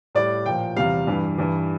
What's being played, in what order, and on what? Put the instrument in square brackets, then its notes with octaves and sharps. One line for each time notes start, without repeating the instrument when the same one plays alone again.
[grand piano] A2 G3 D5
A#2 F3 G5
E2 C3 G3 F5
G2 E3 G3
G2 E3 G3